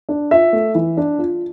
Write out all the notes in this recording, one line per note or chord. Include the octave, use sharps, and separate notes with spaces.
D4
F4 E5
A3
E3
D4
F4